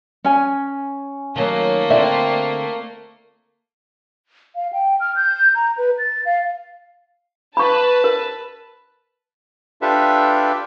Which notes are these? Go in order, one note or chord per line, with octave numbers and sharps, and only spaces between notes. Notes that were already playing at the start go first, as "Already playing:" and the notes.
C#4 G#5
D#3 F#3 A3 A#3
D3 C4 F4 D5 E5
F5
G5
F6
G6
A#5
B4
A6
F5
B4 A5 B5 C#6
A#4
D4 F4 G4 A4 B4 E5